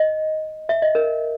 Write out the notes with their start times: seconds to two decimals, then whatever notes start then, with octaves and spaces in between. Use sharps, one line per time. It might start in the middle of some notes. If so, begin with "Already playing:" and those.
Already playing: D#5
0.69 E5
0.82 D#5
0.95 A#4